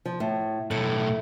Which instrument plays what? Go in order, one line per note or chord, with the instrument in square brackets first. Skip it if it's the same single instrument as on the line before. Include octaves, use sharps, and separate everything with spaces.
[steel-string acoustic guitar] F3
A2
[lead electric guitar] B1 A2 [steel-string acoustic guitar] A3